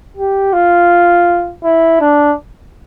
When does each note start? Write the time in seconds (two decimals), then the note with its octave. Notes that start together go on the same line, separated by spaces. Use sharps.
0.17 G4
0.53 F4
1.64 E4
2.01 D4